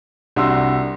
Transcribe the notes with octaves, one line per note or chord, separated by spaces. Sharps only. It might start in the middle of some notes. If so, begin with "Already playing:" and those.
C2 D4 F#4 C6 E6